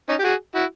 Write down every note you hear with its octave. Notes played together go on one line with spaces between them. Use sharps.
C#4 D#4
G4
F#4 G#4
E4 F#4